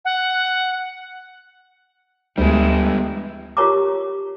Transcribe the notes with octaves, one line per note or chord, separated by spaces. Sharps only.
F#5
D2 E3 G3 G#3 B3 E4
F4 G4 A#4 C#5 A#5 D6